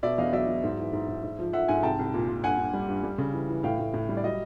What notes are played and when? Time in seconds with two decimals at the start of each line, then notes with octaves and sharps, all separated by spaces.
0.03 B2 D5 E5
0.18 E2 D#5 F5
0.33 F#3 D5 E5
0.47 F#3
0.64 G#2
0.78 E3
0.93 G#2
1.08 G#2
1.23 G#2
1.39 F3
1.53 F3 E5 F#5
1.68 G#2 F#5 G#5
1.83 C2 G5 A5
1.99 C2
2.14 A#2
2.28 A#2
2.44 G2 F#5 G#5
2.58 G2
2.73 G3
2.88 G2
3.03 G3
3.18 C#3
3.34 E3
3.49 E3
3.63 A2 F5 G5
3.79 A2
3.94 A2
4.09 G3
4.17 D5
4.24 F#3 D#5